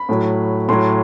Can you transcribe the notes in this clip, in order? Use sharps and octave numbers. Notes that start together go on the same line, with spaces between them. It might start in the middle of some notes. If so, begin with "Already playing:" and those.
Already playing: B5
A2 F#3
A2 F#3 C6